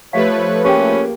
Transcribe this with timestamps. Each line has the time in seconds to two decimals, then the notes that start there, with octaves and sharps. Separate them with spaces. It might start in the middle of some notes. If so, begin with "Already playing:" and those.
0.13 F3 A3 G4 B4 C#5 E5 F5
0.65 A#3 C#4 G4 G#4 G5